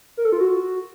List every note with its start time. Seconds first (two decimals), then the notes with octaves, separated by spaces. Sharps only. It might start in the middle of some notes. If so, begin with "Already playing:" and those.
0.17 A#4
0.25 A4
0.32 F4
0.40 F#4